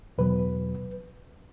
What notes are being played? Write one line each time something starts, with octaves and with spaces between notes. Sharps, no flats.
E2 B2 F#3 B4